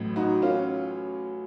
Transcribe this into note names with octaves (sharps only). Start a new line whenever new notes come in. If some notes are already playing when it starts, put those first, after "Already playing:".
Already playing: A1 A2 F#3
D#4 F#4
C#4 F4